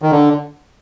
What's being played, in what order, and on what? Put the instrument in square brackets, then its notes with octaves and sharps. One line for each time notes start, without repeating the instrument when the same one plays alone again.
[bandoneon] D#3
D3